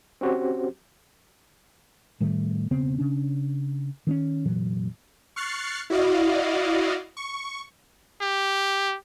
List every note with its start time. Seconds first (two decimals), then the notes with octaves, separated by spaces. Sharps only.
0.21 C4 C#4 F#4 G4 C5
2.20 A2 D#3 G3 A3
2.71 E1 C#3 B3 C4
2.99 C#3 C#4 D4
4.07 D#3 C4 C#4
4.45 F1 A#2 E3 F#3
5.36 C#6 F6 F#6 A6 C7 C#7
5.90 E4 F#4 D5 D#5 F5
7.17 C#6
8.21 G4